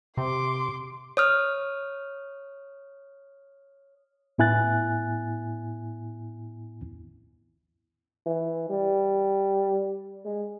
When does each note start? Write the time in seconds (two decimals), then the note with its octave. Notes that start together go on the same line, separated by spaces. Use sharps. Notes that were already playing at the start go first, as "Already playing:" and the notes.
0.17 C3 C6 D6
1.17 C#5 D#6 F6
4.38 A2 B3 E4 G#5 F#6 A6
8.26 E3
8.70 G3
10.25 G#3